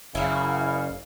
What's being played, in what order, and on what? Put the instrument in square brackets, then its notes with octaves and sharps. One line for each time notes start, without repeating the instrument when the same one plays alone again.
[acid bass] F#1 [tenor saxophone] C#3 [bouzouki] A#3 E4 [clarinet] F5